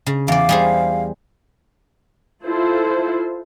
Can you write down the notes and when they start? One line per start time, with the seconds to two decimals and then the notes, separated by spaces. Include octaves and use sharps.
0.06 C#3
0.28 E2 D5 F5
0.49 G3 G#4 C5
2.45 E4 F4 A4 C5